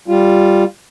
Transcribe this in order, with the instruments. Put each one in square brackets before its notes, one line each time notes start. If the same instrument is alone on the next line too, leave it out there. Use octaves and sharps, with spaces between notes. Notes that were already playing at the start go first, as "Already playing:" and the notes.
[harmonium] G3 F4